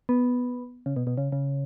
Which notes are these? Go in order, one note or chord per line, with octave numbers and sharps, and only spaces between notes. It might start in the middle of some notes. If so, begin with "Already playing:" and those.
B3
C#3
B2
B2
C#3
C#3